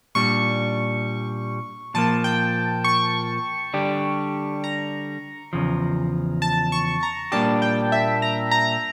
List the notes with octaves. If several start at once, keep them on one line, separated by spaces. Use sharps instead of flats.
A#2 G3 D4 C#6
A#2 F3 A#3 A5
G5
C#6
D3 G3 D4 G4
A#5
E2 C#3 F3
A5
C#6
A#5
A#2 G3 A#3 D4 G4 A5
G5
E5
A#5
A#5